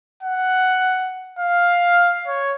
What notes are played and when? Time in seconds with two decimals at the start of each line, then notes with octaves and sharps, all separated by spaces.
0.23 F#5
1.39 F5
2.27 C#5